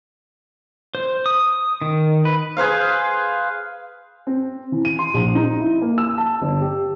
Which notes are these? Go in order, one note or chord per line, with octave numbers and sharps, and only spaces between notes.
C5
D#6
D#3
B4
G#4 B4 C5 F5
C4
E3
D#7
C6
A#1
D#4
E4
A#3
E6
A5
G1
G4